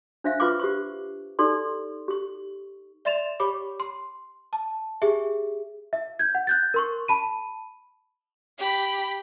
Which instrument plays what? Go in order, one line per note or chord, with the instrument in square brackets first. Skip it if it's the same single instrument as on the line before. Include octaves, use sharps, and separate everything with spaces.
[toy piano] D4 C5 E5 F5
F4 B4 F5 C#6 D6
G4 C5 C#6
D#4 G4 A4 D5 C6
G4 C#6
[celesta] D5 E5 C6 A6 E7 F7
G4 C#5 B5 D6
C6
A5
G4 G#4 E5
E5
G6 G#6
F#5
F#6 G6 A6
A#4 C6 C#6
A5 B5 D#7
[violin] G4 B5